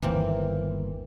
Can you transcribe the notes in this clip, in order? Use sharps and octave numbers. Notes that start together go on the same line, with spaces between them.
G1 D#2 E3 A#3 C4